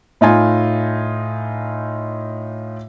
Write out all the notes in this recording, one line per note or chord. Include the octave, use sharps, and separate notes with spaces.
A2 D#4 F4 G#5